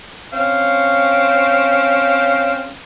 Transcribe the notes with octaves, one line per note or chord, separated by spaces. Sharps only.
C4 C#4 F5